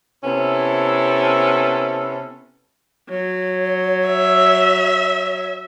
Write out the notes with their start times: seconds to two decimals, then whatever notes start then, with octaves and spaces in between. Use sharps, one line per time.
0.24 C3 B3 C#4 E4 A4
3.09 F#3 C#5
4.07 E5